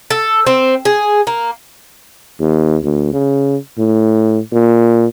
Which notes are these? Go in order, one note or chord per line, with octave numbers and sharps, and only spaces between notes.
A4
C4
G#4
A#3
D#2
D2
C#3
A2
A#2